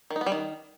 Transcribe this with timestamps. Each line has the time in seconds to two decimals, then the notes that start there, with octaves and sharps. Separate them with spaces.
0.10 D#3
0.16 D#4
0.21 B3
0.26 G3
0.32 D#3